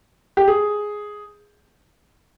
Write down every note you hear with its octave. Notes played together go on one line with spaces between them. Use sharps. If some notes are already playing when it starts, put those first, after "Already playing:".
G4
G#4